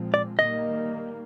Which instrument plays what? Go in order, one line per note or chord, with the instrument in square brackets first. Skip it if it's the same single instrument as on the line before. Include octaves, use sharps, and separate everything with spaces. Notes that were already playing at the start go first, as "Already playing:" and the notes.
Already playing: [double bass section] A#2 F3 G#3 C4
[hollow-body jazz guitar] D5
[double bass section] D#3 G3 A#3 [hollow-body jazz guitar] D#5